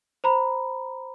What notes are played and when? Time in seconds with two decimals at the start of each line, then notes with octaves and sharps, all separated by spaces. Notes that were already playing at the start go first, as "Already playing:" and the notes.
0.24 C5 A#5 B5